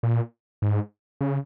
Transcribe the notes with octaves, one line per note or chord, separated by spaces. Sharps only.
A#2
G#2
C#3